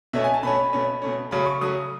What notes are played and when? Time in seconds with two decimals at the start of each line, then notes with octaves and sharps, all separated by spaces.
0.13 B2 A3 C#4 E5
0.24 G#5
0.34 A5
0.43 B2 A3 C#4 B5
0.73 B2 A3 C#4
1.02 B2 A3 C#4
1.31 C#3 F#3 A3 C#4 B5
1.46 C#6
1.61 C#3 F#3 A3 C#4 D#6